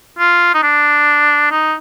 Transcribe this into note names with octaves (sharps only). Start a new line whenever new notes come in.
F4
D#4
D4
D#4